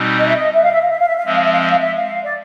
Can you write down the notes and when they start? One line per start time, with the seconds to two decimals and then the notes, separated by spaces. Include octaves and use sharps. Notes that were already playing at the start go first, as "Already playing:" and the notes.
Already playing: B2 G3 C4 D#4
0.19 D#5
0.27 E5
0.36 D#5
0.54 E5
0.63 F5
0.72 E5
0.82 F5
0.90 E5
0.99 F5
1.08 E5
1.17 F5
1.26 F3 G#3 C4 E5
1.35 F5
1.44 E5
1.52 F5
1.62 E5
1.71 F5
1.79 E5
1.97 F5
2.24 D5